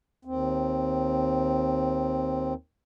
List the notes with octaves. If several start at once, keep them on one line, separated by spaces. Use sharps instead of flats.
D#2 C4